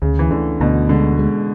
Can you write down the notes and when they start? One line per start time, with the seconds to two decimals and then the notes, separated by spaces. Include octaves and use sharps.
0.02 D2 C#3
0.19 E3
0.31 D2 D3
0.60 D2 B2
0.89 D3 G#3
1.19 G#3